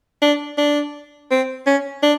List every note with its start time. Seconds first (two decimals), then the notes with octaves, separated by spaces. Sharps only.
0.22 D4
0.58 D4
1.31 C4
1.66 C#4
2.03 D4